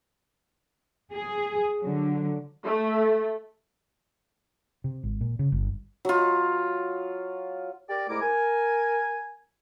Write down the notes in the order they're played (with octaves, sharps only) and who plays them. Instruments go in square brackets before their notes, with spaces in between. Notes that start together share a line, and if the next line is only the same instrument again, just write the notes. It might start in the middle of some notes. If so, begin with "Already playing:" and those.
[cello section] G#4
D3 F#3
[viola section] A3
[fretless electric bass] C3
G#1
A#2
C#3
G1
[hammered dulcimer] F#3 F4
[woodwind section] G4 A#4 D5
C2 G#2 A3 E4 A#4 D6
A#4 G#5